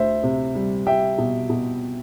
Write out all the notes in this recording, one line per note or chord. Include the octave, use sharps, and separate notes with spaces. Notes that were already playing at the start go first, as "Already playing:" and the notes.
Already playing: D2 C5 E5
C3
G3
G3 E5 G5
B2
B2